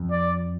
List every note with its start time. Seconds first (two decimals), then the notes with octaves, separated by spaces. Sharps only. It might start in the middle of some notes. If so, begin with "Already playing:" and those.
Already playing: F2
0.11 D5